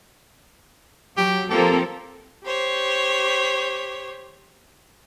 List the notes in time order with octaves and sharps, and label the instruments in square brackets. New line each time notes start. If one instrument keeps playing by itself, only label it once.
[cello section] F#3 [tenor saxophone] G4
[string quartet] F3 A#3 A#4 [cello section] C4 A4 [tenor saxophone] G4
[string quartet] G4 C5 C#5